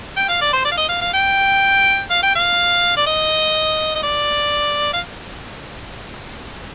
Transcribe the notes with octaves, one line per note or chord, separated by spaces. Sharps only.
G5
F5
D5
C5
D5
F5
D#5
F5
F5
G5
F5
G5
F5
D5
D#5
D#5
D5
F5